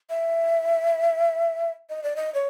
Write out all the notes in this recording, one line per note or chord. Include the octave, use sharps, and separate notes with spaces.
E5
D#5
D5
D#5
C#5